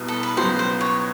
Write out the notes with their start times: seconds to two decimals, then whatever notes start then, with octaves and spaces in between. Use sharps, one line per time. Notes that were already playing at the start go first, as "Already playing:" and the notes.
Already playing: C2 B2
0.08 A4
0.23 B4
0.37 C#2 B2 F#3 C5
0.59 C5
0.81 C#5